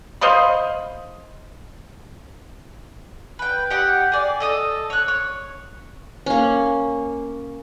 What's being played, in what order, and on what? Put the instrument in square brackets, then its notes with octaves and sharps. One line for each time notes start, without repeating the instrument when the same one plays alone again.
[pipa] C5 D#5 F5 B5
[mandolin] B4 G5
G4 D#5 F#5 G5
G#4 D5
A4 D#5 D#6
C#5 F#6
C#5
[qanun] A#3 C#4